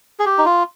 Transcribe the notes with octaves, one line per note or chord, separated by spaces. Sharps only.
G#4
G4
D#4
F4